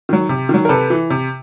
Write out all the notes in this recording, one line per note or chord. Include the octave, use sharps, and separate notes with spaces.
D#3 F#3
C3
D#3 F#3
A#4
C3 A4 B4
E3
C3